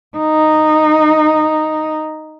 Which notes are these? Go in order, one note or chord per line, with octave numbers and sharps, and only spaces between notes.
D#4